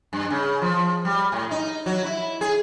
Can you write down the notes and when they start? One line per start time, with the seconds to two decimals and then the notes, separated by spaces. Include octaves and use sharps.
0.13 G2
0.30 C#3
0.62 F3
1.05 G3
1.32 A2
1.51 D#4
1.86 F#3
2.04 E4
2.41 G#4